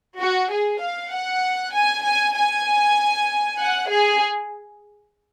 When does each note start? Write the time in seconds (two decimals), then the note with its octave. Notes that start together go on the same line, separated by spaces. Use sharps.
0.20 F#4
0.51 G#4
0.82 F5
1.13 F#5
1.74 G#5
2.05 G#5
2.36 G#5
3.60 F#5
3.90 G#4